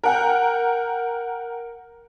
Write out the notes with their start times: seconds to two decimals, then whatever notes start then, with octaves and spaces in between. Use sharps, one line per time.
0.04 A#4 F#5 G5